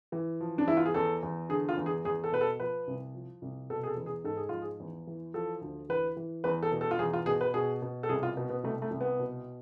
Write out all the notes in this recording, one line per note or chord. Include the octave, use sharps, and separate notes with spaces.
E3
F3
D4
E2 E4
F4
G#4
E2 A4
E2
D3 G#4
F4
E2
G#4
E2 G#4
A4
B2 B4
A4
F3 B4
C2
F3
C2
B2 A4
G#4
A4
E2
G#4
G#2 A4
G#4
F3 F4
G#4
E2
E3
F3 A4
D2
E3 B4
E3
E2 B4
A4
B2
A4
F4
E2 G#4
F4
B2 G#4
B4
B2 G#4
B2
A4
C2 G#4
F4
B2
B3
C2 A3
A3
C2
B3
B2